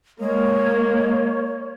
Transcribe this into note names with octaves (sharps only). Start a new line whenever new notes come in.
G#3 A#3 C#5